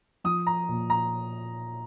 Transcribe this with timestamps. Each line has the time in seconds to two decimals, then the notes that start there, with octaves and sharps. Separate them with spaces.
0.24 F3 D#6
0.47 A#5
0.68 A#2
0.90 A#5